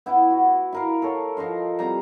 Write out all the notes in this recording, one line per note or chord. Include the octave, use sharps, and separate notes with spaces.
B3 E4
F#4
E4 A#4 F5
A4 A#4 C#5
F3 D#5 F5 C6
C3 G3 A#5